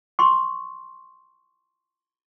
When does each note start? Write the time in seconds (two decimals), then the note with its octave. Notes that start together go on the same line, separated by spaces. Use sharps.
0.19 C6 C#6